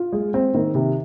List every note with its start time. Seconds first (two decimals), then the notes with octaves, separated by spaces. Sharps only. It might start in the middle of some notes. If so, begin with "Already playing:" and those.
Already playing: F4
0.13 G#3
0.34 C4
0.54 D#3
0.75 C3